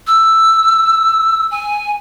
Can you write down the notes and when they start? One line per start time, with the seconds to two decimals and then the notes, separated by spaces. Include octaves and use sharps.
0.07 E6
1.51 G#5